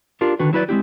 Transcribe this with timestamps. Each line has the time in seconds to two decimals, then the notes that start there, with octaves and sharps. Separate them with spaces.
0.21 D4 F4 G4 A#4
0.39 D3 D#3 F#4 B4
0.53 F#3 E4 B4 D5
0.69 G#3 C4 E4 G4